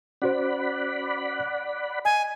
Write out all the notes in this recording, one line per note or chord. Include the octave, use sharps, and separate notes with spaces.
C#4 F#4 C5 D5 F#5 B5
D#5 G#5